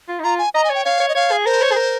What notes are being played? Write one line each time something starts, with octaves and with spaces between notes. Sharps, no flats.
F4
D#4
F4 A#5
G#5
D#5 A#5
G#5
C#5 G5
C#5 F5
C#5
D#5
C#5 F5
G#4
A#4 C5
C#5
G#4
A#4